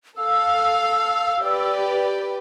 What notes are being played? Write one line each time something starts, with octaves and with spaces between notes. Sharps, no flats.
A4 F5 E6
G4 B4 D5